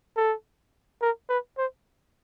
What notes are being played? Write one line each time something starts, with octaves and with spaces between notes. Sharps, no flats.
A4
A#4
B4
C5